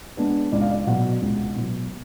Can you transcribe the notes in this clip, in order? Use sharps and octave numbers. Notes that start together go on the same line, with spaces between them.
G#3 B3 D4
C#2 D5
F5
D5
B2 F#3 F#5
C#2
B2 F#3